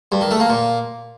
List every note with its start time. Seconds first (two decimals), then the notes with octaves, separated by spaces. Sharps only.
0.12 G2
0.21 D#3
0.31 A3
0.40 A#3
0.50 A#2